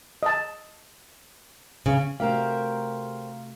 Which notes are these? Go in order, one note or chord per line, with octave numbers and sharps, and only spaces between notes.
D#5 A5
C#3
C3 A3 F#4 G4 A#4 C5 F5